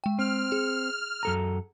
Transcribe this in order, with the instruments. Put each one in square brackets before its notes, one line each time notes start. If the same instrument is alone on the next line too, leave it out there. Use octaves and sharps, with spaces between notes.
[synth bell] G#3 G5
[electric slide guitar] C4 [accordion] F6
[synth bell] G#4
[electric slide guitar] F#2 A4 A#5